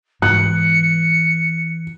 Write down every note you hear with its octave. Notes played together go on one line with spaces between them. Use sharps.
G#2 E3 F#6 C#7